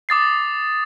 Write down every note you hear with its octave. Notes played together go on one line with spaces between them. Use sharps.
D6 D#6 A6 C7